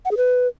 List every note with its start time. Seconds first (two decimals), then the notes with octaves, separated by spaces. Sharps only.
0.05 F#5
0.11 G#4
0.17 B4